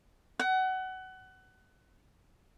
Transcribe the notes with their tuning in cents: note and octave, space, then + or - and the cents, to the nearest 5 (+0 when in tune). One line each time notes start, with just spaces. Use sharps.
F#5 +25